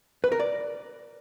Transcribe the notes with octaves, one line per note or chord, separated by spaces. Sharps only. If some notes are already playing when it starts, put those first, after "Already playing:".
B4
A#4
D5